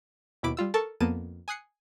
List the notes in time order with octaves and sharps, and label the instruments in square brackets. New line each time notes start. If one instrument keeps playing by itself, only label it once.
[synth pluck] D#2 B2 E4 B5 D6 D7
G3 F4 E6
A4 A#4 A5 C#6
F2 A#3 B3 A5 D#7
G#5 D#6 F#6 C7 C#7